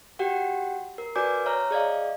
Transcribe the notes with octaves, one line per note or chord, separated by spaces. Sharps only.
F#4 G4 F#5 G5
A#4
F#4 B4 D5 G#5 D6 G6
C#5 E5 A#5 F6
G#4 D5 D#5 F5